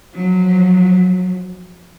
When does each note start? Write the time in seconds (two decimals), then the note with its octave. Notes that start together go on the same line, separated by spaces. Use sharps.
0.13 F3 F#3